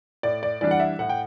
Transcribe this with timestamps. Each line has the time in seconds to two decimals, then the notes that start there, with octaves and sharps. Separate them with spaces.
0.23 A2 D5
0.43 D5
0.61 E3 G3 D4 D5
0.71 F#5
0.80 E5
0.99 A2 F#5
1.09 G5